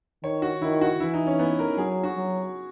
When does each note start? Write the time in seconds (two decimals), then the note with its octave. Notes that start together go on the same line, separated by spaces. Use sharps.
0.23 D#3 C#5
0.42 F#4
0.62 D#3 E4
0.81 F#4
1.00 E3 E4
1.14 D#4
1.27 C#4
1.39 B3
1.59 A#4
1.78 F#3 G#4
2.03 F#4
2.17 F#3